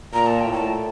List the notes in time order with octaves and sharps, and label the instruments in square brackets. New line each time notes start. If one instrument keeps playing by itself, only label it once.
[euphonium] A#2 [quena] A#5
[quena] A5
G5
[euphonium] A2
[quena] A5